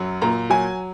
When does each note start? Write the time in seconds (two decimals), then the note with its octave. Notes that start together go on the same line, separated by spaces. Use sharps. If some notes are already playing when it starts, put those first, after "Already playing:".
Already playing: F#2 F#3
0.22 A#2 A#5
0.50 F#3 G#5